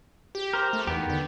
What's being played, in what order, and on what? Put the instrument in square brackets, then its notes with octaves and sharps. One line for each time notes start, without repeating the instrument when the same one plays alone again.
[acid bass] G4
[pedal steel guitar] A#4 C5
[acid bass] A3
[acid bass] E2 [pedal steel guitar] D#3 B3 G4
[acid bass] D3